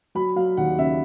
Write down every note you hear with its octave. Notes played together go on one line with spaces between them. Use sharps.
F#3 B5
F#3 F5
D#2 F#5
C#3 E5